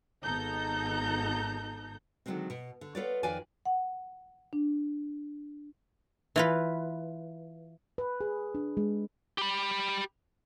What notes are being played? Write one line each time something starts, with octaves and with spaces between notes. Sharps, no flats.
G#1 B3 D#4 A4 A#5 G6
D3 D#3 F3 F#3 G#3 C4
B2
D3
B3 F4 A4 B4 C#5 D5
F2 D#3 F4 B4 D5 G#5
F#5
D4
E3 F4 B4
B4
G#4
D4
G#3
G4 B5